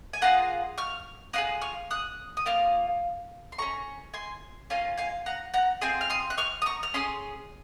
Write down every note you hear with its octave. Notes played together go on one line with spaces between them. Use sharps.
G#5
A#3 F4 G#4 F#5 A#5
C#6 F6
A#3 F4 G#4 D#6 F#6
C#6 F6
D#6 F#6
D#6
A#3 F4 F6
C6
C#4 G#4 A#5 C#6
G#5 C6
A#3 C#4 F4 F5 G#5
F5 G#5
F#5 A#5
F#5 A#5
C4 F4 G#4 G#5 C6
F6
C6 D#6
F#6
C#6 F6
D#6
A#5 C#6
F6
C#4 G#4 C6 D#6